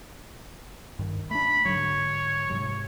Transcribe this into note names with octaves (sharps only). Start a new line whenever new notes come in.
G2 D#3
A3 D4 B5
G#2 D3 F#3 C#5
G#2 C3 F#3